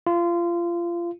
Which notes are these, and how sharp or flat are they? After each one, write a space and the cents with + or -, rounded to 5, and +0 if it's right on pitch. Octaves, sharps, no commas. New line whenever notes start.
F4 -25